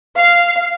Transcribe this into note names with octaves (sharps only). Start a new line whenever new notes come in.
F5